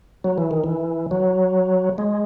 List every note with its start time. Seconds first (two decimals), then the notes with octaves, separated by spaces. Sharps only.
0.24 F#3
0.38 E3
0.51 D#3
0.64 E3
1.11 F#3
1.98 G#3